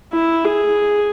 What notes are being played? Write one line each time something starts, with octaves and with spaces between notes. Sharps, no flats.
E4
G#4